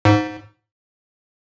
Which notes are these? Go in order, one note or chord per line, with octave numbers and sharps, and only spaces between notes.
G#2